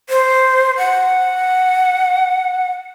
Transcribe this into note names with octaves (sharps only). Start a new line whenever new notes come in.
C5
F#5